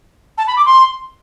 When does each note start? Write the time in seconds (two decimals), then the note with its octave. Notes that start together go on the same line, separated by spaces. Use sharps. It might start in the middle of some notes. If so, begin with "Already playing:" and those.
0.38 A5
0.47 B5
0.57 D6
0.66 C6